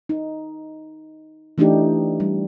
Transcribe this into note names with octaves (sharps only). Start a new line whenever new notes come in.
D#4
E3 A3 D4 D#4 G4
G3